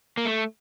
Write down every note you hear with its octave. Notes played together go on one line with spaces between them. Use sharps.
A#3
A3